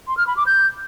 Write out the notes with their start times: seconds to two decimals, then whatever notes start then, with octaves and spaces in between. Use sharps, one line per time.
0.08 C6
0.17 F6
0.27 B5
0.37 D6
0.46 G6